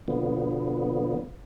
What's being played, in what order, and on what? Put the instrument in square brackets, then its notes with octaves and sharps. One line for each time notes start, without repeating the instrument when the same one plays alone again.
[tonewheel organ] B2 D3 F3 B3